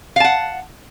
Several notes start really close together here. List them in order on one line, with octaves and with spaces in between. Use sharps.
F5 A5 F#5